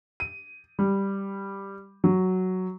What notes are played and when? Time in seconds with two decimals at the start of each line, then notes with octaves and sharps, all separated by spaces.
0.20 D#7
0.79 G3
2.04 F#3